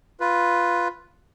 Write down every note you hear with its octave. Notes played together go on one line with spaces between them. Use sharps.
F4 B4